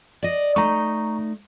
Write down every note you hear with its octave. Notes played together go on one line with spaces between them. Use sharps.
D5 D#5
A3 D#4 A#5 C#6